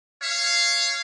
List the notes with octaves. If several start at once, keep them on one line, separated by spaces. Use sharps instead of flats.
C#5 F5